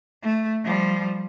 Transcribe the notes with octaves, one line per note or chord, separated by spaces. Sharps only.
A3
F3 G3